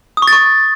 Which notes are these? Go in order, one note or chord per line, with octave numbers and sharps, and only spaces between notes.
D#6
C#6
A6
C#6